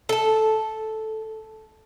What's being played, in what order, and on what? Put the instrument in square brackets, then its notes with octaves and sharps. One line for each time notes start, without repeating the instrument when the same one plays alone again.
[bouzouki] A4 A5